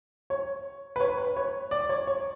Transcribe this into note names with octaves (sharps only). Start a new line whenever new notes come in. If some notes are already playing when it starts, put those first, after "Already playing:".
C#5
B4
C#5
B4
C#5
D5
C#5
C#5